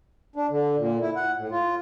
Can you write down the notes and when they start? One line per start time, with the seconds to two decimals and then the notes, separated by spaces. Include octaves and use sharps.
0.36 D4
0.50 D3
0.77 A#2
1.01 E4
1.16 F#5
1.36 A2
1.51 F4